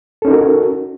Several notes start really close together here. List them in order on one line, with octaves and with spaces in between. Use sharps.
A4 C#4 D#4 A#4 F#4